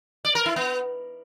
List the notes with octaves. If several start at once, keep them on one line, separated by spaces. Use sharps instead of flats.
D5
A#4
E4
B3